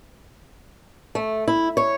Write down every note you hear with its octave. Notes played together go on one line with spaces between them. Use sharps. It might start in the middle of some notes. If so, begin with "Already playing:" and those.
A3
E4
C#5